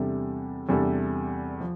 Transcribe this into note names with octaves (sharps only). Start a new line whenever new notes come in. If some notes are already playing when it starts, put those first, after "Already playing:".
Already playing: E2 C3 G3 D4 A4
E2 C3 G3 D4 A4
F3